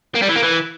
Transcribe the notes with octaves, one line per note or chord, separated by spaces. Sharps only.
A#3
G3
E3
A#3
E3